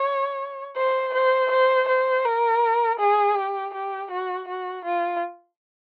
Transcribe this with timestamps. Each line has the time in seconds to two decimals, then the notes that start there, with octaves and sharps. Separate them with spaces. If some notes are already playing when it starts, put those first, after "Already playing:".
Already playing: C#5
0.77 C5
1.14 C5
1.51 C5
1.88 C5
2.25 A#4
2.99 G#4
3.36 G4
3.74 G4
4.11 F#4
4.48 F#4
4.85 F4